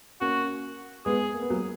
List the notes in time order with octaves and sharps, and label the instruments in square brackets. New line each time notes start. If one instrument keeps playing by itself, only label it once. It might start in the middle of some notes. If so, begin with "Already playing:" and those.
[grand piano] A#3 C#4 [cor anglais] F#4
[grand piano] G#3 B3 [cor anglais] G#4
[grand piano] A#3
B3
F#3 A#3